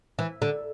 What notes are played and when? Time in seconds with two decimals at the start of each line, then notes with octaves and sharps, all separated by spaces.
0.19 E3
0.42 D3